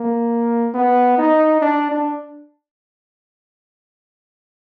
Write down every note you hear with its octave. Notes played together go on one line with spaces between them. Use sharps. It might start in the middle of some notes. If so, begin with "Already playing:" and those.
Already playing: A#3
B3
D#4
D4
D4